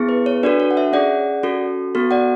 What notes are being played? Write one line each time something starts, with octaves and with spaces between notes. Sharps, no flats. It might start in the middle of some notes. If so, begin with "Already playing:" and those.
Already playing: B3 E4 G#4
B4
C#5
D4 F#4 A4 B4 D5
C#5
F#5
C#5 E5
C#4 G#4 D5 F#5
C#4 F#4 A4
B3 F#4 A4
D5 F#5